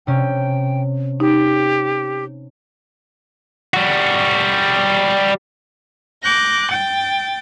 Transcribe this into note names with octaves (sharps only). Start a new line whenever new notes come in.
C3 C#4 G5
D#4 G4
G3 F#4
D6 F#6 G6 A#6
G5 A6